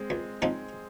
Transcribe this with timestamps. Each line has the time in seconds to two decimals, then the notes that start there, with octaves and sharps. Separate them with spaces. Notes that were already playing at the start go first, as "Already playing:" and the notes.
Already playing: G#3 C4
0.10 C#2
0.42 C#3 F3 C4 D#4